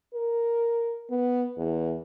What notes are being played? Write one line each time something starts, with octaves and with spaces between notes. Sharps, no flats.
A#4
B3
E2